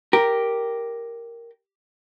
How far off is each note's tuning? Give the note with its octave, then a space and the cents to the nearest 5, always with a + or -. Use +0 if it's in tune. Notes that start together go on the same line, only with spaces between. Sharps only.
G4 +0 A#4 +0